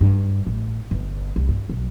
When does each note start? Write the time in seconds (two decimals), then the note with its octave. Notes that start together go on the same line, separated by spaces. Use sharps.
0.01 G2
0.46 A1
0.91 G1
1.36 C2
1.49 G2
1.69 B1